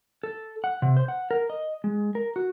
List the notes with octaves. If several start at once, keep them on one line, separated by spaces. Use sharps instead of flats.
A4
F#5
C3
C5
F#5
A#4
D#5
G#3
A#4
F#4